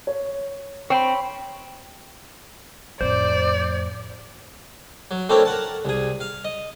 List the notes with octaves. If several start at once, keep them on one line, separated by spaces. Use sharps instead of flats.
C#5
C4 C#5 G5 B5
F2 A2 C5 D5
F#3
A3 C4 D4 E4 A#4 C#5
A#4 F#5 A5
C2 G#4
F5
D#5